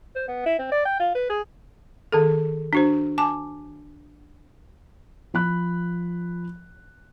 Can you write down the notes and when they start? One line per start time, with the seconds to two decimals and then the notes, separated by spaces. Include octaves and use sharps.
0.16 C5
0.28 B3
0.46 E4
0.59 C4
0.72 D5
0.85 G5
1.00 F4
1.15 B4
1.30 G#4
2.12 D#3 G#4 A4
2.73 D4 F#4 C5
3.18 G#5 A5 D6
5.34 F3 B5 F#6